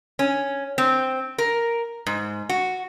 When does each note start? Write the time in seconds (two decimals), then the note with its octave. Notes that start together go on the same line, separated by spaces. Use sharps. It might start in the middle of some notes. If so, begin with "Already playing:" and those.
0.19 C#4
0.78 C4
1.38 A#4
2.06 G#2
2.49 F#4